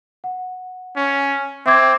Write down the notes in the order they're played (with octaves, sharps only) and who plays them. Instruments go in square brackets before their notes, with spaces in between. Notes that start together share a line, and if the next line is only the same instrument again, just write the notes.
[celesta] F#5
[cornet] C#4
[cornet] C4 [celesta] E5 D6 G#6